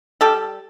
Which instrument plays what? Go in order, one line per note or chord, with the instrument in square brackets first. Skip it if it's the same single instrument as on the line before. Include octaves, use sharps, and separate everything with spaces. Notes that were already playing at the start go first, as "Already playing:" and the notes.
[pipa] G3 G4 A4